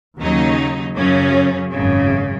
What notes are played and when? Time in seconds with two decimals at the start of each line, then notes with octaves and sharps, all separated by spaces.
0.19 D#2 C#3 F#3 D#4
0.95 F#2 C#3 F#3 C#4
1.72 G#1 F#2 C#3